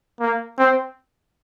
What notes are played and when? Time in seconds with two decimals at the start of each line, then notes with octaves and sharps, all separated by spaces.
0.21 A#3
0.58 C4